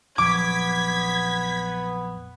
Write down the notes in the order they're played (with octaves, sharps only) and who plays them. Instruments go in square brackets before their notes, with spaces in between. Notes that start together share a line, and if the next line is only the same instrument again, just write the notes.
[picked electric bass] A#1 F2 F#3 [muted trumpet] B3 [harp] D6 [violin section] G#6 B6